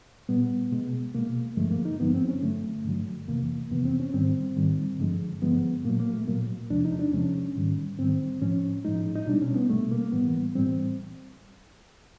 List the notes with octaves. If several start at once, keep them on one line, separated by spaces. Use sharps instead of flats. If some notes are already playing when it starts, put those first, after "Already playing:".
A#2 G3 B3
B2 G#3
B2 G#3 A#3
G2 D3 F3 G#3 A3
A#3
D#4
G2 D3 F3 G#3 B3
C4
C#4
G2 D3 F#3 A3
G2 D3 F#3
F2 C3 E3 A#3
F2 C3 E3 B3
C4
C#4
G#2 D#3 G3 C4
G#2 D#3 G3
G2 D3 F3 G#3
G2 D3 F3 G#3 B3
A#2 F#3 A#3
A#3
A3
A#2 F#3 A#3
E2 C3 F3 G#3 D4
D#4
D4
E2 C3 F3 G#3 C#4
G#2 D#3 G3
G#2 D#3 G3 C4
A2 F3 G#3 C#4
A2 F3 G#3 D#4
D#4
B2 G3 D4
C#4
B3
B2 G3 A3
A#3
A2 E3 G3 B3
A2 E3 G3 C4